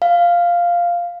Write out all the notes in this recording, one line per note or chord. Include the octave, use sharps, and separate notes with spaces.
F5